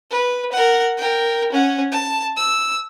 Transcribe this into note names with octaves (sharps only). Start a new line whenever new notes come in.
B4
A#4 F#5
A#4 G5
C#4 F#5
A5
E6